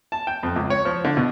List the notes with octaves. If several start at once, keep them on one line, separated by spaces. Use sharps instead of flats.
A5
G5
F2
C#2
C#5
F3
D3
B2